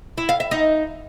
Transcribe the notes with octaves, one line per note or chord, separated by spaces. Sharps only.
E4
F5
E5
D#4